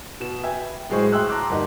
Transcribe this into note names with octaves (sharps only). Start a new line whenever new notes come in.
B2 E7
B4 E5 G5 G#5
A2 F#3 G#3 G#4 C5 C#6
E5 G5 C6 E6 F#6
A5 A#5 C6 D6 F#6
G1 A#3 D#4 G4